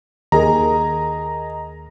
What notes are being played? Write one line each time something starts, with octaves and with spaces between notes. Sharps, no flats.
D#2 G#4 A#4 D#5 A#5